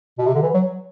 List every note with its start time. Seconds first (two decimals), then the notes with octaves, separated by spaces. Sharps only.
0.18 B2
0.26 C3
0.34 D3
0.42 E3
0.54 F#3